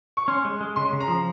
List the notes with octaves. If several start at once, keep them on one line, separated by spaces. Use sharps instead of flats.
C#6
C#4 C6
G#3
G#3
C#3 C6
C#3
A#5
F3